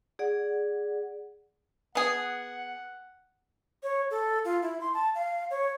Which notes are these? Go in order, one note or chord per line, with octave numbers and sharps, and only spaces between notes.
G#4 D5 F#5
B3 G#4 F#5
C#5
A4
F4
E4
C6
A5
F5
C#5